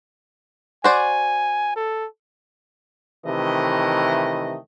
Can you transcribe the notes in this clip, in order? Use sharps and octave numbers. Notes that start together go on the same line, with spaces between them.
F#4 C5 D5 G#5
A4
C3 D#3 E3 A3 D#5